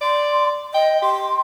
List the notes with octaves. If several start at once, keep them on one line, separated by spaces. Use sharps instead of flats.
D5 C6
D#5 G5
G4 C6